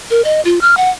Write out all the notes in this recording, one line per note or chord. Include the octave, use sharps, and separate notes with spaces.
A#4
D#5
F4
F6
F#5